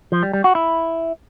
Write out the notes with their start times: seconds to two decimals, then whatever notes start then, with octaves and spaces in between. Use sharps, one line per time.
0.12 F3
0.23 G3
0.33 G3
0.44 F#4
0.55 E4